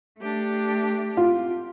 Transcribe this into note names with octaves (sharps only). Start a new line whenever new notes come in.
A3 D4 G4
F4